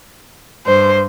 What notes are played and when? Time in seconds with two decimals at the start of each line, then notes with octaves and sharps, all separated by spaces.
0.66 G2 C5